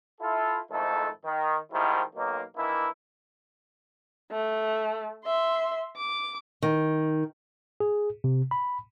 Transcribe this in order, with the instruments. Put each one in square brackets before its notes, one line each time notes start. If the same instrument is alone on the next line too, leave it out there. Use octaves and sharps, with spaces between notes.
[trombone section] E4 F4 A4
F2 G#2 D#3 A3 E4 A4
D#3
G#2 D#3 F3 G3 E4
B1 D#3 A#3
D#3 E3 A#3 D4 E4
[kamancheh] A3
E5 C6
D6
[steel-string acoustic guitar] D#3
[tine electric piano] G#4
C3
B5